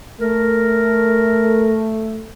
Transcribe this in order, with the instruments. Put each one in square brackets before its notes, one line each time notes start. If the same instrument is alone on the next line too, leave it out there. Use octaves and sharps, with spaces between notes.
[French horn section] A3 [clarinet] A#4